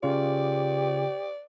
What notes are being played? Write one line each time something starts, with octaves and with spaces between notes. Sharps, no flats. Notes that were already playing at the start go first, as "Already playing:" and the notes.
C#3 F4 G4 D5